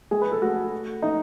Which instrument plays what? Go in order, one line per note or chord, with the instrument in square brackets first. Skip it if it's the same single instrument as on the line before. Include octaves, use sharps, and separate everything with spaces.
[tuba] G#3 [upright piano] G#4
[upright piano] B4
A4
[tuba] A3 [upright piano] F#4
[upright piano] D#4